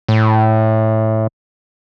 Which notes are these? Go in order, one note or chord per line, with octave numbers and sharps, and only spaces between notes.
A2